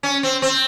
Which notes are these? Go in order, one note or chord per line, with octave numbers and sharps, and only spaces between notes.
C#4
C4
C4